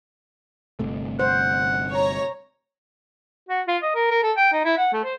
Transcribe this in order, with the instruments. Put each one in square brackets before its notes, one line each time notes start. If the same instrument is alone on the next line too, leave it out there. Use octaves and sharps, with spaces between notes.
[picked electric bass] G1 C3 A3
[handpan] C5 [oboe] F#5
[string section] C#5 A#5
[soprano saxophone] F#4
F4
D#5
A#4
A#4
A4
G5
D#4
E4
F#5
A3
C5